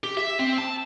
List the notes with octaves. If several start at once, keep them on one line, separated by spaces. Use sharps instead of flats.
G4
E5
C4
A5